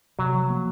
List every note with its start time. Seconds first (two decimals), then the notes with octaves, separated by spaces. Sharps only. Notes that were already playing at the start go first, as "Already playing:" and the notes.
0.19 C3 F#3
0.34 F3
0.50 A#3